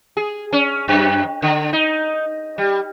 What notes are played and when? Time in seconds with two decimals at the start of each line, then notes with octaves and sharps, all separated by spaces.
0.17 G#4
0.53 C#4
0.88 F#2
1.42 D3
1.73 D#4
2.58 G3